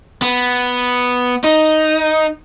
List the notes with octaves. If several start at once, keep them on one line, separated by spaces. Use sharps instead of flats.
B3
D#4